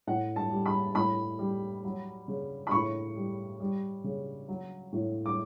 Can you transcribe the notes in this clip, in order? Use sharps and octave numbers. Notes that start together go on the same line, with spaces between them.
A2 F#5
A5
G3
B5
A2 B5
G3
F#3
C#3
B5
A2 C#6
G3
G3
C#3
F#3
A2
D6